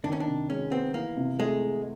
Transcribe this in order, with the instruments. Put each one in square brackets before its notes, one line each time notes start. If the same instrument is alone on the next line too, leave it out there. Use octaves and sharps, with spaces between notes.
[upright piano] D#3 [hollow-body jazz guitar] D4
[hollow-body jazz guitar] C#4
D4
[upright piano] C3
[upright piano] G#3 [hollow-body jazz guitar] C#4
[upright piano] B3 [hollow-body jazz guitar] C4
[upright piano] E3 [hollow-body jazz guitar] A#3
[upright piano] C3
[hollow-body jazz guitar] G#3 [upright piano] A3